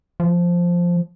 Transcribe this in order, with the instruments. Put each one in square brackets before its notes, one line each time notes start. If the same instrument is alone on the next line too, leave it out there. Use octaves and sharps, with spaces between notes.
[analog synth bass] F3